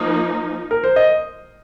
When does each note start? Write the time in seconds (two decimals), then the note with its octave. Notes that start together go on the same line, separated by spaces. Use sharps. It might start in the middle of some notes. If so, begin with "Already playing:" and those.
Already playing: F3 A#3 D#4
0.71 A#4
0.84 C5
0.96 D#5